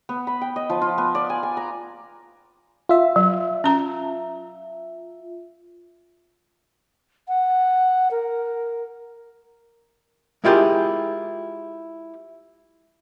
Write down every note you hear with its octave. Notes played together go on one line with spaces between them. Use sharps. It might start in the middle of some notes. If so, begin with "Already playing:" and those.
B3
B5
G5
D#5
F3
F4
B3
D5
G#5
G#5
A#5
F4 E5
F#3
C#4 A#5
F#5
A#4
G#3 E4 F4 G4 G#4 A#4